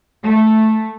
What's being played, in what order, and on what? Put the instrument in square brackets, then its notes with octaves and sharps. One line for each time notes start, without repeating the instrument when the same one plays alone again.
[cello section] A3